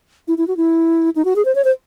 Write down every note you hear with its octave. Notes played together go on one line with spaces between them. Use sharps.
E4
E4
F#4
E4
D#4
F#4
G#4
C5
C#5
C5